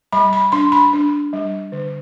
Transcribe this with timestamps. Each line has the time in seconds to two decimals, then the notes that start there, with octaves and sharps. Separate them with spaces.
0.12 G3 B5
0.33 B5
0.52 D4 C6
0.72 B5
0.93 D4
1.33 G3
1.72 D3